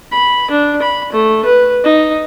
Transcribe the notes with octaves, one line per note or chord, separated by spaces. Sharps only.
B5
D4
B5
A3
B4
D#4